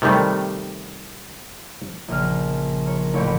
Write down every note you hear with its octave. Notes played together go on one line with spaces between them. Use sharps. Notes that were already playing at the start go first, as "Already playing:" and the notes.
C3 D#3 G3 A3
A#1 C#3 F6
A#4 C#5
D#1 A1 A#2 C#5 G5 B5